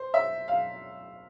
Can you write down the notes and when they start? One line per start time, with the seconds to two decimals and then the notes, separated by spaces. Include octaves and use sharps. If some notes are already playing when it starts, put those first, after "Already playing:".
Already playing: C5
0.14 E5
0.48 F5